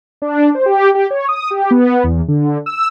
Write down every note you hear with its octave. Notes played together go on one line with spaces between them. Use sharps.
D4
C5
G4
G4
C#5
D#6
G4
B3
E2
D3
E6